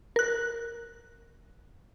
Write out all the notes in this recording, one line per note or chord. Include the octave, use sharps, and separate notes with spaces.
A#4 F#6